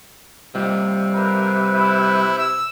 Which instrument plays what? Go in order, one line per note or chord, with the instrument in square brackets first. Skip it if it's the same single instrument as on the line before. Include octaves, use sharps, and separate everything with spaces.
[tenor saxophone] C3 [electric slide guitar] G3 F4 D#5
[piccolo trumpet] A#4 [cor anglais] B4
[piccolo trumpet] E4
E6